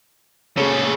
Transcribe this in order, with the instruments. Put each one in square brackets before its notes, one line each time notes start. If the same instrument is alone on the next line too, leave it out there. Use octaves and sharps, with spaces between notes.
[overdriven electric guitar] C#3 A4 [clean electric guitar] A#3 G#4 C#5